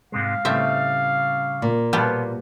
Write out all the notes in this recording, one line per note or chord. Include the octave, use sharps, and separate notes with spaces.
G#2 C3 G#3 F5
A2 C#3 G3 C4 E5
A#2
B2 F3 G3 B3 F4